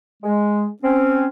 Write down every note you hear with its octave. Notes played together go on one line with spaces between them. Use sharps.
G#3
C4 C#4